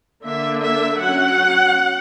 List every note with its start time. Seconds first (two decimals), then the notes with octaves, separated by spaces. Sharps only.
0.23 D3 A#3 D4 E5
0.62 E5
0.99 F#3 C#4 F#5